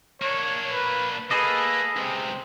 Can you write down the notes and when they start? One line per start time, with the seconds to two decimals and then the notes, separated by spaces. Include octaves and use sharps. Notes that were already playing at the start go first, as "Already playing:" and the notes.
0.22 A#3 D4 C#5
0.72 B4
1.31 A#3 G#4 A4 B4 D#5
1.96 C#2 C3 C4